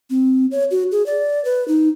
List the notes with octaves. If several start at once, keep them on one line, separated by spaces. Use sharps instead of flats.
C4
C#5
F#4
G#4
D5
B4
D#4